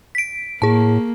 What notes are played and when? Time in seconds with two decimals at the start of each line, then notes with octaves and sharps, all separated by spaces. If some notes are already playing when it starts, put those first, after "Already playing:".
0.15 B6 D7
0.62 A2 A#3 G#4 A5